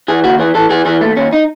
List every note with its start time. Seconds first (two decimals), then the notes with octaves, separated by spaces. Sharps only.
0.08 E3 G#4
0.24 D#2 F#4
0.39 E3 G#4
0.55 E3 A4
0.70 E3 G#4
0.85 E3 G#4
1.01 D#2 A3
1.17 D#2 C#4
1.33 D#4